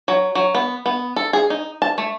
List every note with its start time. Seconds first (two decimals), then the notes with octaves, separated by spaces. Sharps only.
0.08 F#3
0.35 F#3
0.55 B3
0.86 B3
1.16 A4
1.33 G#4
1.50 D#4
1.82 A5
1.98 A3